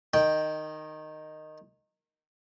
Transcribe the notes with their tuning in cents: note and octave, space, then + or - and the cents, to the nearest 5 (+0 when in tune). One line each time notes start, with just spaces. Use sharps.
D#3 -10 G5 +0